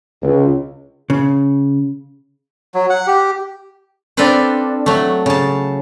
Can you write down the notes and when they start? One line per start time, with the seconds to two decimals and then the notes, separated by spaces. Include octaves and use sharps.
0.23 C#2
1.10 C#3
2.74 F#3
2.90 F#5
3.07 G4
4.17 C4 D4 F4 A4 B4 C5
4.86 F#3 A3
5.26 C#3 A5